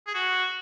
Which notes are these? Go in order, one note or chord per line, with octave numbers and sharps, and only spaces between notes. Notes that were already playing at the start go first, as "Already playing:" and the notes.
G#4
F#4